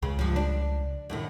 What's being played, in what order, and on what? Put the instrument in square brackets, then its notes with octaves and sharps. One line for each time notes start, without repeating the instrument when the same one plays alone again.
[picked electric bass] C#2 [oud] C#3
[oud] G2 F3
D4
F#2 A2 D#3